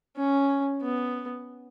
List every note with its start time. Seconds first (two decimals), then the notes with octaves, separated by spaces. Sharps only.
0.17 C#4
0.82 B3